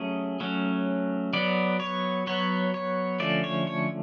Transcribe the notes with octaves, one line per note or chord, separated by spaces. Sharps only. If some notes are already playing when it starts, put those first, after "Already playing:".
Already playing: F#3 A3 C#4 G#4
F#3 A3 C#4
F#3 B3 D5
C#5
F#3 B3 C#5
C#5
D3 F3 A3 C#4 D5
C#5
C#5